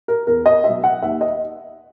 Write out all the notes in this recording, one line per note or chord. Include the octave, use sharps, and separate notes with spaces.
A#4
E2 A#4
D#5
B2 F#3 E5
F#5
D#2 E5
D#5